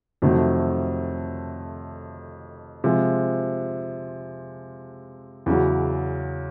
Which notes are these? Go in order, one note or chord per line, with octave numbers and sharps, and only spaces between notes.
F2 C3 D#3 F#3 A3
C3 F3 G#3
E2 C#3 F#3